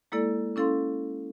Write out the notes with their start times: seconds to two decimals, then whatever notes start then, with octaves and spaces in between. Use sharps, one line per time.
0.12 G#3 A#3 E4 A4 D5
0.56 C#4 E4 A4 F5 C6